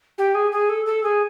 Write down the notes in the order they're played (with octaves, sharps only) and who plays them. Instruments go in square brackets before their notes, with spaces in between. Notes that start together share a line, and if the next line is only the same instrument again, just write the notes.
[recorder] G4
G#4
G#4
A4
A4
G#4